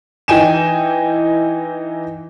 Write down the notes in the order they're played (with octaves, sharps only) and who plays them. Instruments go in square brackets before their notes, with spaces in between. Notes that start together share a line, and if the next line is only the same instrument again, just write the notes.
[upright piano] E3 D#4 G5 G#5 E7